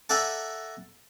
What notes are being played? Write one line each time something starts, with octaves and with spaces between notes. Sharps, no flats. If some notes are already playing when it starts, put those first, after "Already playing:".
A4 D5 E5 F#5 G#5 A#5